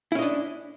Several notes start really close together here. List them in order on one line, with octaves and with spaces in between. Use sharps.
E4 C#4 D#5 D4